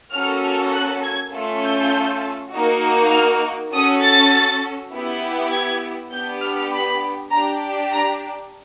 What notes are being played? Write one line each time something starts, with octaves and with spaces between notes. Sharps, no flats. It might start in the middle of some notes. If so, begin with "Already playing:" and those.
A#3 C#4 F#4 A4 F6
F6
F#6
G#6
A3 C#4 F4 A4
G6
A#3 D#4 F#4
F6
C#4 F#4 A4 D#6
A6
B3 E4 G4
G#6
B3 D4 G4 G6
F6
B5
D4 G4 A#5
A#5